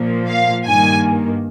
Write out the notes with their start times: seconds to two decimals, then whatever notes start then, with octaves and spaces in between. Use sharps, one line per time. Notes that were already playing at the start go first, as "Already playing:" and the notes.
Already playing: A#2 F3 A#3
0.28 F5
0.67 G2 D#3 A#3 G#5